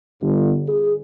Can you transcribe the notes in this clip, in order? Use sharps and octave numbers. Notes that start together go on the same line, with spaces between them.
G1
G#4